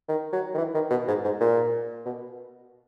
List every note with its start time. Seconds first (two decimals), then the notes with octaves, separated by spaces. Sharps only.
0.09 D#3
0.33 F#3
0.54 D#3
0.58 E3
0.74 D#3
0.90 B2
1.08 G#2
1.24 G#2
1.40 A#2
2.06 B2